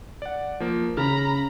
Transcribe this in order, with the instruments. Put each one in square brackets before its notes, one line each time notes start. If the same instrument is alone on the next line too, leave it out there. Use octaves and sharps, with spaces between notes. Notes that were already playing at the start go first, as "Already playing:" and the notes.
[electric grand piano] D5 F#5
F3 A#3
[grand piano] C#3 [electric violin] A#5 B5 [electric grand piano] F6